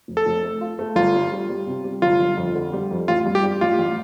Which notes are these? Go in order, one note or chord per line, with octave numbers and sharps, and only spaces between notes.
F1
A4
F1
A3
F4
A3
G1 F4
G3
G3
G3
C3
G3
G1 F4
G1
F2
D3
G3
F2
A1 F4
G2
G4
G3
A1 F4
A1